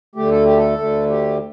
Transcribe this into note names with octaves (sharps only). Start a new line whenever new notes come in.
D2 D3 A3 G4
A4
G4
A4
D2 D3 A3
G4